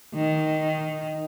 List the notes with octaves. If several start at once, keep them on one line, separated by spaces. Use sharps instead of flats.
D#3